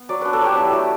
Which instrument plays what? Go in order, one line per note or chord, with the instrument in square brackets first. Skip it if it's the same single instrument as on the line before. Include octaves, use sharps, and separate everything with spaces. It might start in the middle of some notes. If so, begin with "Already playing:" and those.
Already playing: [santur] B3
F#3 D5
D4 B4
A4
F#3 G4
E4
A3